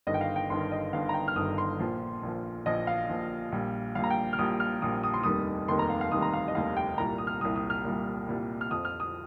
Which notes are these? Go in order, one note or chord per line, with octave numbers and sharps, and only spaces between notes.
G1 G2 D#3 D#5
G5
F5
G5
G1 G2 D#3 C6
D#5
G1 G2 D#3 F5
A#5
G5
F6
G1 G2 D#3 D#6
C6
A#1 A#2 F3
A#1 A#2 F3
A#1 A#2 F3 D#5
F5
A#1 A#2 F3
A#1 A#2 G3
A#1 A#2 G3 F5
A#5
G5
F6
A#1 A#2 G3 D#6
F6
A#1 A#2 G3 D#6
D#6
C6
F1 D#2 D#3 G3 D#6
F1 D#2 D#3 G3 C6
A#5
F5
F5
F1 D#2 D#3 G3 D#6
A#5
F5
D#5
F1 D#2 D#3 G3 F5
G5
C2 A#2 G3 A#5
D#6
F6
C2 A#2 G3 D#6
D#6
F6
C2 A#2 G3
C2 A#2 G3
F6
F2 F3 D#6
F6
D#6